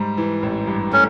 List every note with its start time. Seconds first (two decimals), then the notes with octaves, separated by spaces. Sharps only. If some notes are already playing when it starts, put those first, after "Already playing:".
Already playing: G#2 G3
0.17 E3
0.43 A1
0.67 G2
0.92 A3 C#4